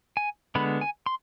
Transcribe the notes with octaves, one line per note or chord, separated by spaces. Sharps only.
G#5
D3 G#3 B3 B5
G#5
C6